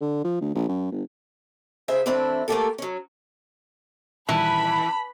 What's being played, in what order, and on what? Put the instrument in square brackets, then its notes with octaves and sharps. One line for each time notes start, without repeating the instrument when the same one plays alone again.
[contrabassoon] D3
F3
D2
A#1
F#2
G1
[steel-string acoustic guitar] C#3 G#4 C5 E5
E3 A3 C4 D4 E4
A3 A#3 D#4 F4 G4 A4
F#3 C#4
[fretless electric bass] A#2 D#3 G3 [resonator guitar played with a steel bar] E3 [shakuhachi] A5 [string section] B5